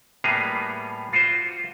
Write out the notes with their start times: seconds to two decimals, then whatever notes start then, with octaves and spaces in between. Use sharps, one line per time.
0.24 A2 G3 A#3 B3 G#4 A#5
1.13 F4 F#4 C5